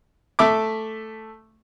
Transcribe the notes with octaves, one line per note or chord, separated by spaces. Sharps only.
A3 E5 D6